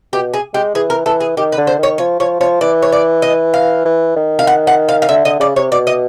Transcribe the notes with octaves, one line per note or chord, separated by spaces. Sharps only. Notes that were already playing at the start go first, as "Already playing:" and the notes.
B2 G4
G#4
G#3 G4
E3 G#4
A#4
E3 A4
G#4
D#3 G4
B4
D3
C5
D#3 C#5
F3 C#5
F3 C#5
F3 C#5
E3 D5
C#5
D5
D#5
F5
E3
D#3
F5
F#5
F#5
F5
F5
D3 E5
D3 D#5
C#3 D5
C3 C#5
B2 D5
D#5